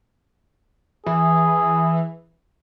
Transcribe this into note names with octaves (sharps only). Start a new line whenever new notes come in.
E3 G#4